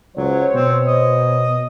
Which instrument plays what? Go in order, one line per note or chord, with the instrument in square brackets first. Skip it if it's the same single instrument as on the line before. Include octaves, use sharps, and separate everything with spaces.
[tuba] C#2 [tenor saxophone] F#3 [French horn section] C5 C#5
[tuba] B2 [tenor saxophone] C4
[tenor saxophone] D#5